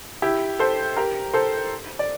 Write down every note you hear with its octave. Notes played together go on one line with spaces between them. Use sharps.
E4 G4
A4 C5
G4 A#4
A4 C5
D5